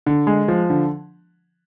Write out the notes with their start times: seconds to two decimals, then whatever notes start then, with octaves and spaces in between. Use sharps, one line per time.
0.06 D3
0.27 G#3
0.48 F3
0.70 D3